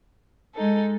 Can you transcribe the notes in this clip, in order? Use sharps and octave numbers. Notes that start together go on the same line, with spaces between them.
G#3 D#4 A4